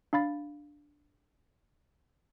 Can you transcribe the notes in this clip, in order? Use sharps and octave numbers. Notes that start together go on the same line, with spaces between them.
D4 F5 B5 A6